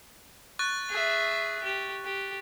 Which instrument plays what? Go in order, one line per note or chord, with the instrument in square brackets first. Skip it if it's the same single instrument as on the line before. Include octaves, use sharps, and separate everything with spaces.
[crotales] C#6 F#6 A6
[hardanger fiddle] G#4 E5
G4
G4